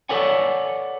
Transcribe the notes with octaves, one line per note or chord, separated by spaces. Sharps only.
A4 B4 C#5 D5 F#5 G#5